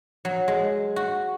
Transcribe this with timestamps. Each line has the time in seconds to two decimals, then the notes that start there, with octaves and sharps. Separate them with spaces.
0.25 F#3
0.48 G#3
0.96 F#4